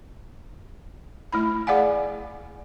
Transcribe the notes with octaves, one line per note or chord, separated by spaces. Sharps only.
A3 E4 B5
G#4 D5 F5 F#5 G#5